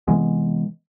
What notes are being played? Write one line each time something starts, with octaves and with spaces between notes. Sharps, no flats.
C3 E3 G#3 B3